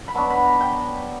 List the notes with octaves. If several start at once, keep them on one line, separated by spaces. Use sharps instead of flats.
B5
B2 F#3 B3 D4 C#6
B5
A#5
G5